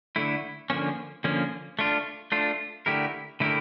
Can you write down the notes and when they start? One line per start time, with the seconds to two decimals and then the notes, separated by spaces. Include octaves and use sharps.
0.16 D3 A3 E4
0.70 D3 F3 A#3 C#4
1.24 D3 F3 A#3 C#4
1.79 A3 D4 F4
2.32 A3 D4 F4
2.86 D3 A3 E4 G4 A#4
3.40 D3 A3 E4 G4 A#4